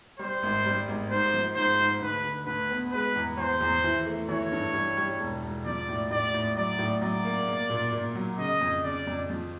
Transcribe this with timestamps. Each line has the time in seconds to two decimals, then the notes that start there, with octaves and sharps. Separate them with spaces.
0.19 G3 C5
0.43 G#1
0.66 G3
0.88 G#1
1.11 G#2 C5
1.34 F3
1.56 G#2 C5
1.79 G#2
2.01 D2 B4
2.24 D3
2.46 D2 B4
2.70 B3
2.92 G#3 B4
3.16 E2
3.37 E2 C5
3.61 E2
3.84 E3
4.07 A3
4.29 E3 C#5
4.52 G2
4.74 G3
4.97 G3
5.20 E1
5.42 E1
5.65 F3 D5
5.88 A2
6.10 A2 D5
6.34 A2
6.57 F#3 D5
6.79 A2
7.01 F#3 D5
7.25 A#3
7.47 A#3
7.70 A#2
7.92 A#2
8.15 F#3
8.38 C#3 D#5
8.61 F2
8.84 C#3 D5
9.07 F2
9.30 F3